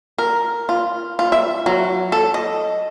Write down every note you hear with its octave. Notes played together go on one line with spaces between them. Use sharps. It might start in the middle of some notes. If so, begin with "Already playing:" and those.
A#4
F4
F4
E5
F#3
A4
D#5